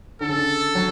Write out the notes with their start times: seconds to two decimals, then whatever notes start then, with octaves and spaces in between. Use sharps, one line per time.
0.21 D3 A4
0.29 C#3
0.36 D3
0.75 F#3